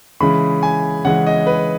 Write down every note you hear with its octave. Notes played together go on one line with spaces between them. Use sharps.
C#3 E3 G#3 B5
G#5
C#3 E3 G#3 F#5
D#5
B4